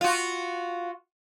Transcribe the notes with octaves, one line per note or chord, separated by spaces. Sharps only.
F4 F#4